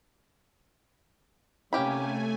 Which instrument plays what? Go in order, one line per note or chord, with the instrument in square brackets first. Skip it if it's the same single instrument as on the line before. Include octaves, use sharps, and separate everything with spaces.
[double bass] C3 [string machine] A3 G#5 [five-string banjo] A#3 G4 B5 [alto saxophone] C#4